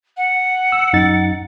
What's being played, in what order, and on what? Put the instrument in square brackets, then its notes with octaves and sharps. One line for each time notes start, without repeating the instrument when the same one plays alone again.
[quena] F#5
[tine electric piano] E6
F#2 D#4 A6